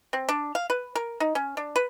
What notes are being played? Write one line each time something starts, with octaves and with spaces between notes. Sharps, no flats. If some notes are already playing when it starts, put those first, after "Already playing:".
C4
D4
F5
B4
A#4
D#4
C#4
D4
B4